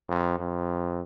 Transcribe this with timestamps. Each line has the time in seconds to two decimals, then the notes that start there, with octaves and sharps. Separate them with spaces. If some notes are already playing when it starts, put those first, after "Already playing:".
0.09 F2
0.39 F2